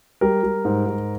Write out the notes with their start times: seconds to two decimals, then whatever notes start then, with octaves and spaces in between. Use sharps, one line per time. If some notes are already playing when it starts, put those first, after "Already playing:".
0.21 G3 A#4
0.43 G3
0.65 G#2
0.86 G#2